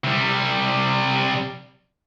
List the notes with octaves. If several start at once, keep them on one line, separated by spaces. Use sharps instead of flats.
C3 G3